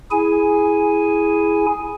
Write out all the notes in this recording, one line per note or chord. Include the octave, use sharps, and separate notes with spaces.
E4 G#4 G#5